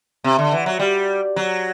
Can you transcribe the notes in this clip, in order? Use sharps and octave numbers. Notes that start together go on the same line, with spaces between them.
C3
D3
E3
F#3
G3
F#3